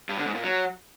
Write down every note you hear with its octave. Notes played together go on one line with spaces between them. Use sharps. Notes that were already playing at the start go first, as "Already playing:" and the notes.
G2
D3
G#2
A#2
F#3